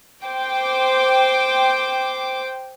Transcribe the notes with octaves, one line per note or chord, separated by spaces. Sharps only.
C5 G5 D6